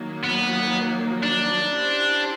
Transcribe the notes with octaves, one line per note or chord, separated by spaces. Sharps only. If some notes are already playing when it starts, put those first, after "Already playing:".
Already playing: D#3 F#3 A#3
B3
D4
C#4 E4 G4 C5